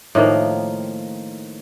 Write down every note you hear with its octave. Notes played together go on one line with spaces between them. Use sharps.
A2 D#3 F3 A#3